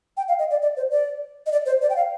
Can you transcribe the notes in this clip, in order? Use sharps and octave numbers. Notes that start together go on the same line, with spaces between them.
G5
F5
D#5
D5
D5
C5
D5
D#5
D5
C5
D5
G5
F5